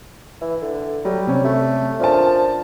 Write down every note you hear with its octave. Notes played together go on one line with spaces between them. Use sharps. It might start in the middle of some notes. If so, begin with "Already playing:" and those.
E3 E5
D3
F#3 G3
C3 C#4
A3
F3 D4 A#4 A5